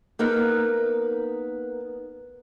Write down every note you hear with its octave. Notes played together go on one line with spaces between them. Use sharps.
A#3 B3 D#4 A#4 B4